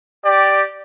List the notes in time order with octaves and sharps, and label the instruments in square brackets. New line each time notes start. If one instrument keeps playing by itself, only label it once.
[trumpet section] G4 D5